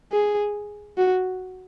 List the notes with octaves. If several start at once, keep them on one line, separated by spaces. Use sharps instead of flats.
G#4
F#4